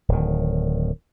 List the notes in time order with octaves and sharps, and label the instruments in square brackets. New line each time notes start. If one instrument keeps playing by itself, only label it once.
[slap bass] D1 D#3